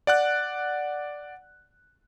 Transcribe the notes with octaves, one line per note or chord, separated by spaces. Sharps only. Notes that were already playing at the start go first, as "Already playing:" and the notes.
D5 F#5 F#6